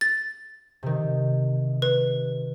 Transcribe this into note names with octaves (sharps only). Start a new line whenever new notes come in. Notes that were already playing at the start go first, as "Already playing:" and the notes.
A6
C3 D#3
B4